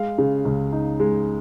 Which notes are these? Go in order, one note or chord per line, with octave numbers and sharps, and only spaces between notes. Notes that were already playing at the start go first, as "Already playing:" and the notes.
Already playing: G#3 F5
C#3
C#2
D#4
G#3